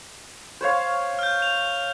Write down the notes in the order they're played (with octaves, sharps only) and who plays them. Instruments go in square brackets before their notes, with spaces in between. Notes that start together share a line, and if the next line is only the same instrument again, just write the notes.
[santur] C5 C#5 F5
[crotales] F6 G6
G6 F7